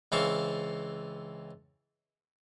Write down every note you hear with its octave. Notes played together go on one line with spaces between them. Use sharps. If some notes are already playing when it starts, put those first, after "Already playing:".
C#2 E3 C4 F5 A5 C#6